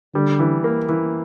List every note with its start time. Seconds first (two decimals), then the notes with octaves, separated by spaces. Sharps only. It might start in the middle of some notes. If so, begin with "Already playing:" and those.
0.14 D3 G3
0.39 E3
0.64 A#3
0.89 E3